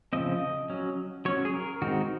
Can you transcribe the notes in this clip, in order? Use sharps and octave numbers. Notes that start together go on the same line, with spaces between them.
C#3 F3 C4 D#5
F#3 C#4
F#3 C#4 C#5
G#4
A#4
D#3 G#3 C4 D#4 F#4